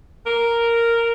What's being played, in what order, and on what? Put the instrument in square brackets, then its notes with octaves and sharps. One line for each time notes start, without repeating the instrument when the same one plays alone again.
[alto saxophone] A#4